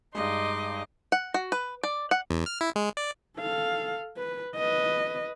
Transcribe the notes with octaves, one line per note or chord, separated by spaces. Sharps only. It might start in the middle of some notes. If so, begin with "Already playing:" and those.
G2 G#3 D#4 D#5 C6 D6
F#5
F#4
B4
D5
F#5
E2
F6
E4
G#3
D5
A4 F5
B4
B4 D#5